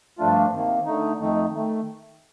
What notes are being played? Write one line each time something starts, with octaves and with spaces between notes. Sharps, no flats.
G2 F3 A3 D4 F4
C3 D#3 A#3
D3 A3 D#4
F2 D#3 A3 D#4
D#3 A3